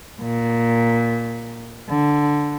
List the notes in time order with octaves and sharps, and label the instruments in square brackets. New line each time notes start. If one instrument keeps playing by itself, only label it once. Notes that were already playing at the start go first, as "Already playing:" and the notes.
[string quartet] A#2
D3